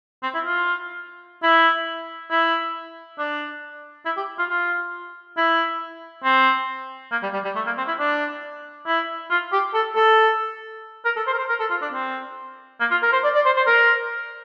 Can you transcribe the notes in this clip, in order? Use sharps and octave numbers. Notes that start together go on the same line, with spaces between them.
C4
E4
F4
E4
E4
D4
E4
G4
F4
F4
E4
C4
A#3
G3
G3
G3
A3
A#3
C4
E4
D4
E4
F4
G4
A4
A4
A#4
A4
C5
A#4
C5
A#4
A4
F4
D4
C4
A#3
F4
A#4
C5
D5
D5
C5
C5
A#4